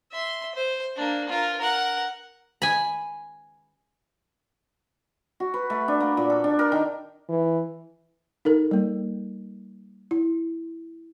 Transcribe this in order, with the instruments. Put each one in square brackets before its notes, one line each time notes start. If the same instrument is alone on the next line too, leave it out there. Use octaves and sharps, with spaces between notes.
[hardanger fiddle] E5 C6
C5
A#3 D4
F4 A#4
A#4 F#5
[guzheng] G#5 B5
[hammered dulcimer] F#4
B4
A3
D4
A#3
A#2
A4
D4
A#4
D#3
[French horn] E3
[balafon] D#4 A4 A#4
G3 A#3
E4